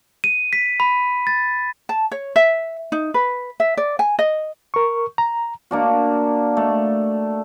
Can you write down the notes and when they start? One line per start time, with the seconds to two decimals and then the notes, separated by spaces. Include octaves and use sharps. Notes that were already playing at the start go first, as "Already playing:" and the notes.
0.24 D#7
0.53 B6
0.80 B5
1.27 A6
1.89 A5
2.12 C#5
2.36 E5
2.92 D#4
3.14 B4
3.60 E5
3.77 D5
3.99 G#5
4.19 D#5
4.74 A#4 C#6
5.18 A#5
5.71 A#3 D4 F#4
6.57 A3